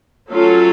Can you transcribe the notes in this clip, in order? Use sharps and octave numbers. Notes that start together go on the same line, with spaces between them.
F#3 A3 C#4 F4 A4